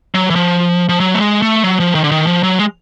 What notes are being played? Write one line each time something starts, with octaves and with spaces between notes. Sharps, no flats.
F#3
E3
F3
F3
F#3
A3
G#3
A3
F#3
F3
D#3
D3
D#3
F3
F#3
G#3